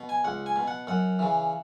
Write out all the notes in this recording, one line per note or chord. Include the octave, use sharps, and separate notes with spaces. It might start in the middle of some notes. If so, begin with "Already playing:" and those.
Already playing: B2
G#5
C#2 F#5
G#5
B2
F#5
F#2 F#5
C#3 E3